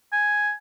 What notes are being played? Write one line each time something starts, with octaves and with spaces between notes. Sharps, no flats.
G#5